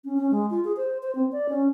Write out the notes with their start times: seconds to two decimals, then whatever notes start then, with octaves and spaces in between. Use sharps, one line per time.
0.05 C#4
0.17 C#4
0.31 G#3
0.50 F4
0.65 G#4
0.77 C5
1.03 C5
1.15 C4
1.32 D5
1.49 C#4